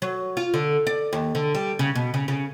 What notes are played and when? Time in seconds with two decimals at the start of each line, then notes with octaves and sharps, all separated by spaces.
0.02 F#3
0.37 F4
0.54 D3
0.87 D5
1.13 D#2
1.35 D3
1.55 G3
1.79 C#3
1.95 B2
2.14 C#3
2.28 C#3